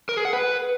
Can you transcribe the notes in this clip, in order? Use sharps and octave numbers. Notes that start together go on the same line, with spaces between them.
A#4
G#4
F#5
B4